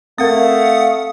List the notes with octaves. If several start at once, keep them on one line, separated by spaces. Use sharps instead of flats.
A3 C4 A#4 F5 F#5 D#6